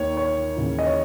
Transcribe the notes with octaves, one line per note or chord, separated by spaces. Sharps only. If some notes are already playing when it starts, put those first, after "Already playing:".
Already playing: D#2 D#3 C#5
C#5
D#2 C#3 E3
D#5
C#5